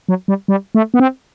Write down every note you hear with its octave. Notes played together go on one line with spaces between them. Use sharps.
F#3
G3
G3
A3
B3
C4